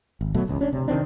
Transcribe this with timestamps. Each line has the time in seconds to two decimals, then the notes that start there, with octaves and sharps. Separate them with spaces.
0.21 G#1
0.34 B2 F#3 A3
0.47 E1 C#2
0.61 C#4 D4
0.73 C3
0.88 C3 D#3 C4 D4